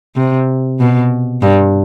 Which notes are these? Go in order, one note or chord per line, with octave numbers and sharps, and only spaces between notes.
C3
B2
G2